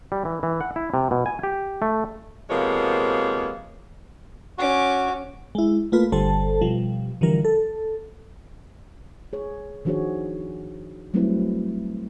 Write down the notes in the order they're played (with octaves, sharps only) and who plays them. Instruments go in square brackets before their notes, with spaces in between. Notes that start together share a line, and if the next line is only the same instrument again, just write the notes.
[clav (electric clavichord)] G3
E3
E3
F#5
E4
C3
B2
G#5
G4
A3
[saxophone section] C3 F3 G#3 A#3 B3 C#5
[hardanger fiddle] C#4 D6 [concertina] F#4
[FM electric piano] G#3 E4
A3 A#3 F4 B4
G1 D3 G3 A4 C5 A5
B2 F3 G3
D3 E3 F3 G3 A#4
A4
[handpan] G#4 C#5
D#3 F3 D4 F#4 G#4 C#5
F#3 G3 A3 C4 E4 B4